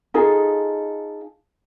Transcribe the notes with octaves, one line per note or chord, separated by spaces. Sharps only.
D#4 F4 G#4 A4